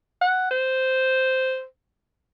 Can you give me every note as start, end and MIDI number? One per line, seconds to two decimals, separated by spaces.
0.22 0.46 78
0.51 1.63 72